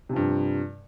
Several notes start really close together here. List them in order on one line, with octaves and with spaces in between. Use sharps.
C3 F3 G2